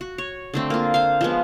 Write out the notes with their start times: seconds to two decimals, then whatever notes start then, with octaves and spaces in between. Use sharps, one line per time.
0.01 F#4
0.18 C#5
0.54 D3 A3 C4
0.70 A#3 F4
0.94 C5 F5
1.21 F3 G#3 B3